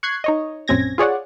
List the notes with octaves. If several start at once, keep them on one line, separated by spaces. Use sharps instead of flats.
C#6 F#6 G#6 C7
D#4 C#5 D#5
A#1 F#2 C4 C#4 G#6 A#6
F4 G#4 C#5 D5 F#5